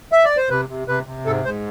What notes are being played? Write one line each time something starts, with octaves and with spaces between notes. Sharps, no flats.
E5
D5
C5
C3 B4
C3
C3 B4
C3
G#2 A4
G#2 C5